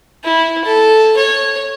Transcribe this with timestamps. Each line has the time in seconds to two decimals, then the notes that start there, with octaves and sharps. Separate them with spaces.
0.24 E4
0.64 A4
1.16 C#5